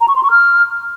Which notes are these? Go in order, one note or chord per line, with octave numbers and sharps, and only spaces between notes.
A#5
C#6
C6
C#6
F6